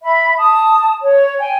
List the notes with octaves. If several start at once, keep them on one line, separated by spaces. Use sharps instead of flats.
E5 B5
A5 D#6
C#5
G5 G#5